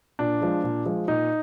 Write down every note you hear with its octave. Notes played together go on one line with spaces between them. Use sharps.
A#2 D4
F3 G#3
A#2
F3 G#3
A#2 D#4